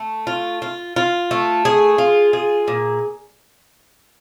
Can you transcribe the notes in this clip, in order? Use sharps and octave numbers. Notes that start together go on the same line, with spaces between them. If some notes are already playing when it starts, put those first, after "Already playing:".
Already playing: A3
F4
F4
F4
A3
G#4
F4
G#4
A#2